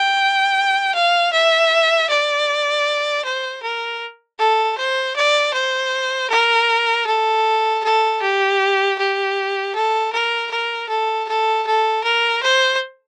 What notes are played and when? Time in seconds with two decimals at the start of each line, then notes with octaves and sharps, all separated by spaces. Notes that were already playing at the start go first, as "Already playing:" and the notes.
Already playing: G5
0.94 F5
1.33 E5
2.10 D5
3.24 C5
3.63 A#4
4.39 A4
4.77 C5
5.16 D5
5.53 C5
6.30 A#4
7.06 A4
7.84 A4
8.22 G4
8.98 G4
9.75 A4
10.12 A#4
10.51 A#4
10.89 A4
11.28 A4
11.67 A4
12.04 A#4
12.43 C5